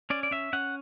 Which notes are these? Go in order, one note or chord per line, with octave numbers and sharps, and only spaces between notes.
C#4 D5
D5
C#4 E5
C#4 F#5